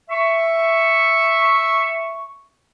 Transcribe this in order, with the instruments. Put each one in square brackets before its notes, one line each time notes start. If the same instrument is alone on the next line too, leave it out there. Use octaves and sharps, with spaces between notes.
[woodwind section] E5 C#6